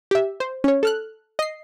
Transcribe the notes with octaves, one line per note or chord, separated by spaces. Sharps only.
G4 E5
C5
C#4 C#5
A4 F6 F#6
D#5 C7